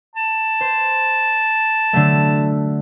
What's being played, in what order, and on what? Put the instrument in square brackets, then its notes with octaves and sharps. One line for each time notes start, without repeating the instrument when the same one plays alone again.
[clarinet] A5
[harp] C5
D3 F#3 A3